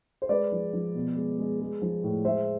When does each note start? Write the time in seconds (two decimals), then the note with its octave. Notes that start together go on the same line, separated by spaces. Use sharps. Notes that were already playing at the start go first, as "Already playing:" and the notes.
0.22 C5
0.29 G#3 B4 D5
0.52 F3
0.73 F3
0.95 B2
1.16 G#3
1.38 G#3
1.60 G#3
1.81 F3
2.03 A2
2.25 G#3 C5 E5